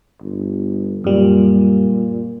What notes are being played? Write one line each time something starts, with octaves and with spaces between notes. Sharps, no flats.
G1
F#2 A#2 G3